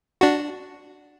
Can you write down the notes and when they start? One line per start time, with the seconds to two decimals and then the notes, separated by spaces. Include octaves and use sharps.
0.21 D4 F#4